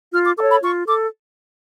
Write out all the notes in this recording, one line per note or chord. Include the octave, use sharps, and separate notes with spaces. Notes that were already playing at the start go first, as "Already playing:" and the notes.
F4 F6
D6
A4 C#5 D6
B5
F4 C#6
A4 D6